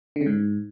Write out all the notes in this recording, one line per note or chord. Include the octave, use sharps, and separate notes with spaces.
D3
C#3
G#2